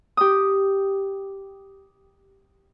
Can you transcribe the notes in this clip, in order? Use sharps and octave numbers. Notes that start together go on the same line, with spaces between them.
G4 D#6